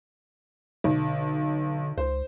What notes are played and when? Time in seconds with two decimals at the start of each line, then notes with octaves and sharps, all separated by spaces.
0.84 B1 D3
1.98 C#2 C5